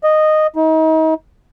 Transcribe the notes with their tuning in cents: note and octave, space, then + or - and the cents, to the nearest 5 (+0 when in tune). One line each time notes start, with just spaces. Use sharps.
D#5 -10
D#4 +35